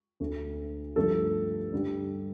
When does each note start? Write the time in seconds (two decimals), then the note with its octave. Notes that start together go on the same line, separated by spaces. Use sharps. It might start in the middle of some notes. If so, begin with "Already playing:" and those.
0.20 D2 D3 A3
0.96 G2 D3 F3 A3 A4
1.72 G2 D3 G3